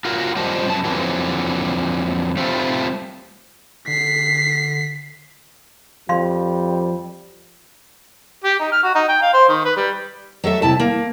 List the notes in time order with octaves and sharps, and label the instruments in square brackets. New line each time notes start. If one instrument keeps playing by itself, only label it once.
[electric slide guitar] F4 F#4 A#4
G3 F4 G4 C5 D#5 A5
F#2 B2 A5
F2 A#2 D3 E3 F#3
G3 A3 C4 F4
[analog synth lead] D3 [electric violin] B6 C7
[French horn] F2 [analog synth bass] F3 [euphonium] G3 [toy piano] F5 C6
[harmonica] G4
D#4
F6
F#4
D#4
G5
F5
C5
D#3
B4
G3
[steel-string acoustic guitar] F#3 A3 A4 E5
C3 E4 A5
A#3